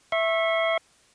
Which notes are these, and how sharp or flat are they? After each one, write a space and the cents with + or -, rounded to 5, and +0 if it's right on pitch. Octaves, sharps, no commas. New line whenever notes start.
E5 +0 C#6 -30